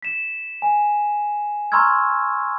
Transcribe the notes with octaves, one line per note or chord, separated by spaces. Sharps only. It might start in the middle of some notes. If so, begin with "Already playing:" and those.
B6 E7
G#5
A#5 C6 C#6 E6 F6 G#6